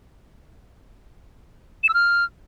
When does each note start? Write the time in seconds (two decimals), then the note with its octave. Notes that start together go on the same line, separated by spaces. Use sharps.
1.83 E7
1.89 E6
1.94 F6